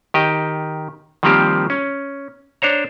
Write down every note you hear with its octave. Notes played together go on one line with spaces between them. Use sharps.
D#3 G4 D#5
D#3 F3 G3 A#3 C4 G4
C#4
D4 C5 C#5 A#5